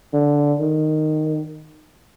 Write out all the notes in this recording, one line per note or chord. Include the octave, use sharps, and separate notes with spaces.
D3
D#3